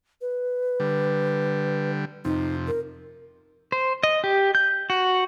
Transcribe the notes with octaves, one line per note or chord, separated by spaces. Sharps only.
B4
D3 G3
F2 C3 D#4
A#4
C5
D#5
G4
G6
F#4